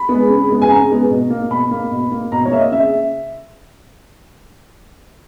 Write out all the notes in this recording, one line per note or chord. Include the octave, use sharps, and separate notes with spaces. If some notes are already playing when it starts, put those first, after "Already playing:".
Already playing: B5
G#3 B3
C#3
G#3 B3
G#5
C#3 A#5
G#3 B3
B2
A#3
B2 B5
A#3
B2
A#3
B2 A#5
C#5
A#3 E5
D#5
C#3 E5